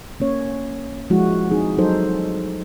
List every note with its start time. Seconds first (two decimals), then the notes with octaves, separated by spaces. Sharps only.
0.20 A#3 C#4 C#5
1.10 F3 G#3 E4 F#4
1.51 C4 D#4 G#4
1.77 F#3 G3 D#4 A4 C5